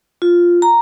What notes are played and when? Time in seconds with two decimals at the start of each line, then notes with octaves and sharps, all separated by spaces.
0.22 F4
0.62 A#5